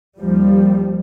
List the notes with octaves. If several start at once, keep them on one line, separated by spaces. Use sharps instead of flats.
D#2 F3 G3